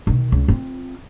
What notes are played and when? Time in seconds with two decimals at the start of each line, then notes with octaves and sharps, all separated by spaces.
0.07 B2 D#3
0.32 C#2
0.48 C4 F4